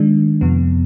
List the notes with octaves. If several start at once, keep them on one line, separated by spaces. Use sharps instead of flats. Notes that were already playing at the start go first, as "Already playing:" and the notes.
Already playing: D#3 G#3 D4
F2 C3 F3 B3